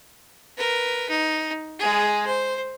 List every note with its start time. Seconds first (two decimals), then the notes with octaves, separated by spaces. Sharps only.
0.57 A#4 B4
1.09 D#4
1.79 G#3 G#4
2.26 C5